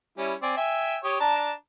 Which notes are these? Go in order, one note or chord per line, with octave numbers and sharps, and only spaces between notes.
G3 C#4 E4
C4 D5 G#5
E5 G5 G#5
G4 C#5 D#6
D4 A5 A#5